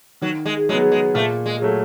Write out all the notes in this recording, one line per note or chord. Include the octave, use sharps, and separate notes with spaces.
D#3 F#3
G#3
F#3 G#3 B3
G#3
A#2 A3
G#3
F#3 A3